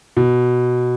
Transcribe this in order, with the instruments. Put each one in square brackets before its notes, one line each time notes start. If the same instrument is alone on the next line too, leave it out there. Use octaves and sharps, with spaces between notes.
[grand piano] B2